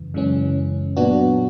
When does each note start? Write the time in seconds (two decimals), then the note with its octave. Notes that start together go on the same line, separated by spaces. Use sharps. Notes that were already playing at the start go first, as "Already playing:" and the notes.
Already playing: F#2 C#3 E3
0.14 F#2 C#3 E3 G#3 C#4
0.96 A#2 F#3 B3 D4 F#4